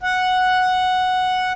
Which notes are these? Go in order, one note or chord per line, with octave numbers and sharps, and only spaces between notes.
F#5